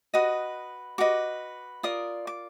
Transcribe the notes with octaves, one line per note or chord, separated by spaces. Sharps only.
F#4 B4 D#5 D#6
F#4 B4 D#5 D6
F4 A#4 D5 D#6
D6